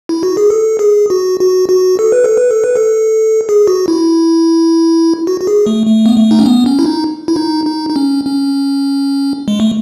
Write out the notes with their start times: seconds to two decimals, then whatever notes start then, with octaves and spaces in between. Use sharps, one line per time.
0.09 E4
0.23 F#4
0.37 G#4
0.50 A4
0.79 G#4
1.10 F#4
1.40 F#4
1.69 F#4
1.99 A4
2.12 B4
2.24 A4
2.37 B4
2.51 A4
2.64 B4
2.76 A4
3.49 G#4
3.68 F#4
3.88 E4
5.27 F#4
5.41 F#4
5.47 G#4
5.66 A3
5.87 A3
6.06 B3
6.16 A3
6.31 D#4
6.39 C#4
6.46 B3
6.66 C#4
6.79 E4
6.86 D#4
7.28 E4
7.36 D#4
7.66 D#4
7.90 D#4
7.96 C#4
8.25 C#4
9.48 G#3
9.60 A3